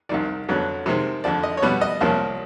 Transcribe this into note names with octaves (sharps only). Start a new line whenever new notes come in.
C2 C3 D#3 D5
F2 D3 F#3 B3
C3 D#3 G#3 C4
F2 D3 F3 D5
D#5
C#5
B2 G3 B3 D5
D#5
C2 C3 F3 A#3 C#4